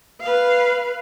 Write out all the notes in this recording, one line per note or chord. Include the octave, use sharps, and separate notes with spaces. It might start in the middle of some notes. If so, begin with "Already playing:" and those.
B4 F5